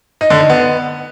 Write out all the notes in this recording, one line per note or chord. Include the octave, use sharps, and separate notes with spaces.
D#4
D3
D#4
B3